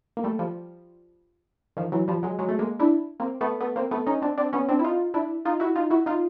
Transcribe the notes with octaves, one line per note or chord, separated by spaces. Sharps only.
A#3
G3 A3
F3 G3
D#3 F3
E3 F#3
F3 G3
F#3 G#3
F#3 G#3
A3
G#3 A#3
D4 E4
A#3 C4
A3 B3
A3 B3
A#3 C4
A3 B3
C#4 D#4
C4 D4
C4 D4
B3 C#4
C4 D4
E4
D#4 F4
D4 E4
D#4 F4
E4 F#4
D#4 F4
E4 F#4
D#4 F4